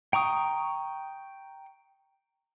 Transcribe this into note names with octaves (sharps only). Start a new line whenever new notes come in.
G5 A#5 C#6 D#6